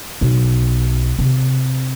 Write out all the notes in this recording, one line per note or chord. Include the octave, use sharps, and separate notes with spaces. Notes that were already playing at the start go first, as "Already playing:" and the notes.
B1
C3